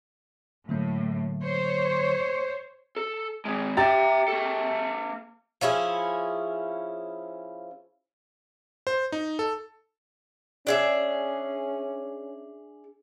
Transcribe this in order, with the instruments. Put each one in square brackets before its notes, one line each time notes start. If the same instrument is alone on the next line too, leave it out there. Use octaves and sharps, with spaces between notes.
[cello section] A2 [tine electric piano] D3 F#3 A#3
[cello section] C5 C#5
[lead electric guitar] A4
D#3 G#3
[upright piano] G4 A6 [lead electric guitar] E5 A#5
[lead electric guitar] A#3 A4
[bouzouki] F3 C#4 E4 G#4
[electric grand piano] C5
D#4
A4
[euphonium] C#4 [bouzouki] D4 G#4 E5